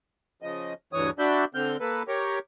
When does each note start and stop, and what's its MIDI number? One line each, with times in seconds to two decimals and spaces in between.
0.42 0.73 49
0.42 0.73 53
0.42 0.73 75
0.93 1.10 38
0.93 1.10 43
0.93 1.10 52
0.93 1.10 73
0.93 1.10 87
1.19 1.45 62
1.19 1.45 66
1.19 1.45 74
1.19 1.45 76
1.19 1.45 83
1.19 1.45 91
1.55 1.77 50
1.55 1.77 60
1.55 1.77 89
1.55 1.77 91
1.80 2.03 58
1.80 2.03 69
1.80 2.03 71
2.08 2.39 67
2.08 2.39 70
2.08 2.39 73